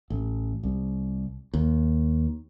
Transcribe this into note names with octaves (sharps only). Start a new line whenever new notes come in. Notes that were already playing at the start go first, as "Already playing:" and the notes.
A1
C2
D#2